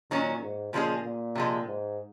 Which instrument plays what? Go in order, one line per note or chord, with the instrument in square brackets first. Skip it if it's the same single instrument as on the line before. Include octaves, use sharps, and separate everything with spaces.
[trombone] A#2 [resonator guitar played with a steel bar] D#3 F#3 C#4
[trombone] G#2
[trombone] A#2 [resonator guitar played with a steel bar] C#3 F3 G#3 C#4 G#4
[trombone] A#2
[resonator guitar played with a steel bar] C3 F3 G#3
[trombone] G#2